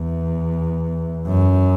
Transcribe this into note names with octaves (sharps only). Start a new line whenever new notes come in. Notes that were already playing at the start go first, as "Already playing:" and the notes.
Already playing: E2
F#2